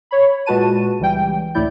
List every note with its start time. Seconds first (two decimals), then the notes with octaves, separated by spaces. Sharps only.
0.11 C#5 B5
0.46 A#2 G#3 F#4 B4 A5 D#7
0.99 C#2 E3 G3 G5
1.55 A1 D2 A2 E4 D5 G6